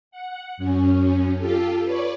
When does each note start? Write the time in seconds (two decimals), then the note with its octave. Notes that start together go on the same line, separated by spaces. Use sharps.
0.11 F#5
0.57 F#2 C#4
1.36 F4 G4 A4
1.83 B4 C#5 D5